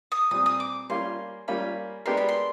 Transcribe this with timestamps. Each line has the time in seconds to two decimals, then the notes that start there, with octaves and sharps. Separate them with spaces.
0.12 D#6
0.31 A#2 G3 C4 D#6
0.46 D#6
0.60 D6
0.89 G3 A#3 C#4 F4 C6
1.48 G3 A#3 C#4 F4 B5
2.05 G#3 B3 D4 G4 A#4 C6
2.17 B5
2.29 C6